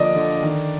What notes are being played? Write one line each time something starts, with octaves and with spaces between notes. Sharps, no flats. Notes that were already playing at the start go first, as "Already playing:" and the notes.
Already playing: D3 F3 A#3 D5 D#5
D3
D#3